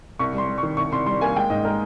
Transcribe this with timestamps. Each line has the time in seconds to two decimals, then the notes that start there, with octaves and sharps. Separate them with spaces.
0.19 C2 C#6
0.33 G3 C6
0.48 G3
0.58 C#6
0.63 D#3
0.77 C2 C#6
0.92 C2 C6
1.06 G3 C6
1.21 A#3 G#5
1.35 G#3 G5
1.50 G#2 D#5
1.65 G#3 A#4